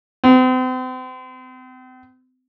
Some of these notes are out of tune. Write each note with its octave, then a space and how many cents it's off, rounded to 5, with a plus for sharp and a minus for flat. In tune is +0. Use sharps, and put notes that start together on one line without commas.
C4 -40